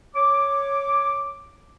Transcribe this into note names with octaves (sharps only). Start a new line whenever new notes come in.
C#5 D6